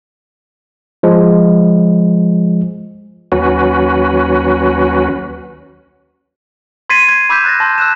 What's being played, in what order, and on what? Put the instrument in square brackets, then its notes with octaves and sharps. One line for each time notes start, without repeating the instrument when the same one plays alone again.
[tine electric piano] F3 G#3
[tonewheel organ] D#2 F#3 C#4 F#4 B4
[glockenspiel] C6 G#6 A6 B6 C7 D#7
G#6
B5 D6 E6 G6 B6 E7
F#6 A6 A#6
A5 C6
E6 F#6 E7